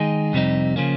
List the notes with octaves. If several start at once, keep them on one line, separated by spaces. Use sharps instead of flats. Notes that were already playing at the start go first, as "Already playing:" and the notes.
Already playing: D#3 G#3 D#4 G#4
F2 C3 G3 C4 D#4
C#3 F3 A#3 C#4